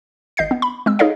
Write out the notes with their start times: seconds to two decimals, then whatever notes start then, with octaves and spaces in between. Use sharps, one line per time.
0.37 G#1 D#5 G6 C7
0.51 B3
0.62 B5
0.86 G#3 C4 E6
0.99 D#4 G#4 A4 C#5 D#5 F5